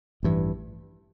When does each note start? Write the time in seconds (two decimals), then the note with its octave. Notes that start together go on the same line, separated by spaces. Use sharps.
0.23 A1 G2 E3